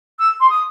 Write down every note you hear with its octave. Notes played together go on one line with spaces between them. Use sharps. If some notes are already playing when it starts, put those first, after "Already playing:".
E6
C6
D#6